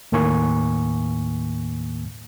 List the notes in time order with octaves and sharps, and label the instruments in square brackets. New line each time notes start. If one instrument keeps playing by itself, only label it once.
[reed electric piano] D#2 A2 D#3 A#3 G#5 C#6